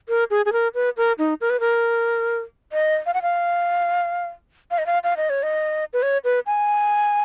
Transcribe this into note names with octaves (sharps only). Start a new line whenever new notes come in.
A#4
G#4
G#4
A#4
B4
A#4
D#4
A#4
B4
A#4
D#5
F5
F#5
F5
F5
D#5
F5
F5
D#5
C#5
D#5
B4
C#5
B4
G#5